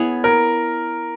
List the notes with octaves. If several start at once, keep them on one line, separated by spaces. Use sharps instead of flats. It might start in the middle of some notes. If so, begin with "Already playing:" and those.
Already playing: B3 E4 G#4 C#5
A#4